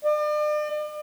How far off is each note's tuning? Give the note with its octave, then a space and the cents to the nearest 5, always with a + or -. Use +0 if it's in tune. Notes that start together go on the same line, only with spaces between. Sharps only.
D5 +40